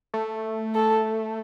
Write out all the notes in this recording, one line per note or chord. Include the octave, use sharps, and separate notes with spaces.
A3
A4